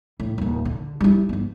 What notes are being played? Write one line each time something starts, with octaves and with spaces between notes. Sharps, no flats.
A2
D#1 A#2
D3
G3 E4
G1 B3